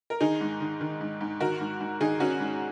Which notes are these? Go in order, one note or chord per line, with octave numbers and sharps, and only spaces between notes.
A#4
D#3 D#4 G#4
G#2
D#3
D#3
G#2
G#2
D#3 F#4 A#4
G#2
G#2
D#3 D#4 G#4
D#3 C#4 F#4
G#2